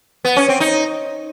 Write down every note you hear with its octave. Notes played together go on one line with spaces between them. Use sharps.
B3
C#4
C4
D#4